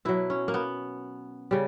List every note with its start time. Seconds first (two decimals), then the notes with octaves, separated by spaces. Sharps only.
0.05 B2 F#3 E4
0.30 C#4
0.48 A#3
0.54 B3
1.51 C#3 G3